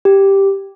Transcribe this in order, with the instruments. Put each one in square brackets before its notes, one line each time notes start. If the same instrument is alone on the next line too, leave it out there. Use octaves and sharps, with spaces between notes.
[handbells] G4